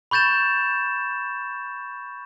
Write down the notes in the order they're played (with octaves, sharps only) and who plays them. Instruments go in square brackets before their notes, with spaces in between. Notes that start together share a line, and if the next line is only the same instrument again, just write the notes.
[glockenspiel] B5 C#6 G6 A6 E7